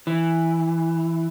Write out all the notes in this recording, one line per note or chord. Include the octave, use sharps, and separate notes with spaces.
E3